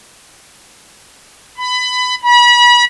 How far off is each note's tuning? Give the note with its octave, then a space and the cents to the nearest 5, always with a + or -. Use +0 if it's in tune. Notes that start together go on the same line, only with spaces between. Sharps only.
B5 +20
B5 -35